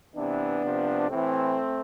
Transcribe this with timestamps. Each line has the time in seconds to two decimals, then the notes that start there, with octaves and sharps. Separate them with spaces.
0.15 C3 E3 B3 D4
0.63 C3 F3
1.09 A2 E3 A3 C4